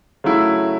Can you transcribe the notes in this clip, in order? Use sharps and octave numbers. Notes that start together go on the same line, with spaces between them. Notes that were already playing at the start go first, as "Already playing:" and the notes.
C#3 F#3 A3 E4